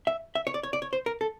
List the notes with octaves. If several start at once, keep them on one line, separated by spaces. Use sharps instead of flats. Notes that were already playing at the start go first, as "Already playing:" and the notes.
E5
E5
C#5
D5
C#5
D5
C#5
C5
A#4
A4